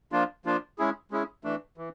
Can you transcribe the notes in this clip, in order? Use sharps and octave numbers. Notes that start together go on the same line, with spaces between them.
F3 A#3 D4 F4
F3 A#3 D4 F4
G#3 C#4 E4 G#4
G#3 C#4 E4 G#4
E3 A3 D4
E3